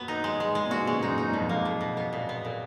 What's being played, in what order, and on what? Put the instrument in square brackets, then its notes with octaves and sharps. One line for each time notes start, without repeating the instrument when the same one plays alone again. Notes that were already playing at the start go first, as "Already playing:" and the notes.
Already playing: [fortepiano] F#2 A#2 [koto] F#3 B3
[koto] D#4
G#3
G#3
G#3
[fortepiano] A#2
[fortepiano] G#2 B2 [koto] F#4
[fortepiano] A#2 C#3 [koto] G#3
[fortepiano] F#2 A#2 [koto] D#4
[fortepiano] G#2 [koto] D#4
[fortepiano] A#2
[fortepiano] F2 G#2 [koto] B2
[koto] A#3
B2
B2
B3
A#2
B3
A#2